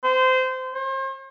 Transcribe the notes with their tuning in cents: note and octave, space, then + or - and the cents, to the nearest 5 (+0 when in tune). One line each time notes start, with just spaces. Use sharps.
C5 -25
C5 +40